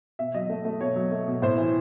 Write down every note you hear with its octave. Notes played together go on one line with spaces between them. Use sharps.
B2 E5
F#3 D#5
A3
A3
B2 C#5
F#3
A3
B2
A2 C5
E3